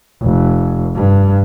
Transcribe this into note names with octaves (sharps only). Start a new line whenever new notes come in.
F1
G2